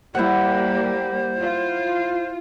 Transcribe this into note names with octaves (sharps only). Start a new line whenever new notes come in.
G3 A#3 E4 G4 C5 F#5
F4